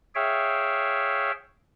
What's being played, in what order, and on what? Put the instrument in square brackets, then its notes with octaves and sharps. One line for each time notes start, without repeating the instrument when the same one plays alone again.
[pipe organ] G#4 C#5 E5 F5 G5